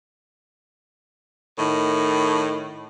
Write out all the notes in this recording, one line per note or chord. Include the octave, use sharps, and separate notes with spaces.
A2 D#3